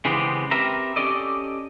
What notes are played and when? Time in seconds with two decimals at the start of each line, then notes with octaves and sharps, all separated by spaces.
0.05 C#3 E3 G#3 B3 C4 G4
0.51 C4 G4 A#4 B4 E5 A#5
0.96 C#4 D4 G4 A4 D5 D#5